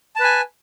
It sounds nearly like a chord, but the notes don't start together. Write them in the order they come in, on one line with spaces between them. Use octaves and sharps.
A5 B4 G#5